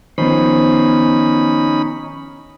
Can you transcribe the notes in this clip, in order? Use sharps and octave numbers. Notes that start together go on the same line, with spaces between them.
D#3 F3 B3 C#4 D#4 C5 B5